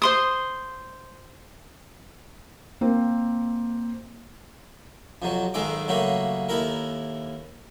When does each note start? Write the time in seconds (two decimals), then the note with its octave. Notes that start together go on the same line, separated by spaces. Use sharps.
0.02 C5 C6 D#6
2.81 A#3 C4
5.22 F2 C3 F#3
5.54 B1 G#2 D#3 G#3 A4 D6
5.88 C#3 F#3 G3 A3 A#3
6.49 D#2 E4 A4 A#4